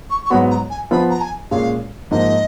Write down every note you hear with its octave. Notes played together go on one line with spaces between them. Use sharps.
C#6
C#6
G#2 F#3 B3 F#4 B5
A#5
G#5
F3 B3 F4 B5
A#5
G#5
A#2 G#3 C#4 F5
G#2 F3 A#3 D#4 D#5